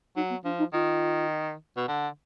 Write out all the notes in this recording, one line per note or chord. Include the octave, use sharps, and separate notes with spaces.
F#3 D#4
B3
F3 D4
D#4
D#3 F4
B2
D3